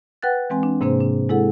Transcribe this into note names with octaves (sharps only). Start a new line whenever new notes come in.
B4 F#5 G5 F#6 A6
E3 G#3 C4 G#5
D4
G#2 C3 A#3 D4 G#4 C5
D4
G#3 E4 G#4 A4 F#5